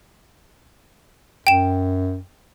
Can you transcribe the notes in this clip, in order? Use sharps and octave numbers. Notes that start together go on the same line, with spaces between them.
F#2 G5 E7